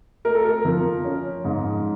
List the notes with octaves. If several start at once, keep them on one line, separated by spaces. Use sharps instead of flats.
A3 A#4
A4
A#4
F3
C#4
G#2